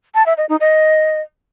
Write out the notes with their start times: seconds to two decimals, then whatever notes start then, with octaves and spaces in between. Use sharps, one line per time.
0.15 A5
0.26 E5
0.38 D#5
0.49 D#4
0.61 D#5